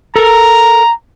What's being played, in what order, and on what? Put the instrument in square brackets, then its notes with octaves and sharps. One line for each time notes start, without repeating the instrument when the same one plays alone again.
[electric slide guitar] A4 A#4 [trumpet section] A#5